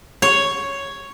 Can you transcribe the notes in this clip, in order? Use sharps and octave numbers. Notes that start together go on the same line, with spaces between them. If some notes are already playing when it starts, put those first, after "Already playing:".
C#5